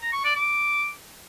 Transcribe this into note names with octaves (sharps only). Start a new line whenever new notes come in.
A#5
C#6
D5
D6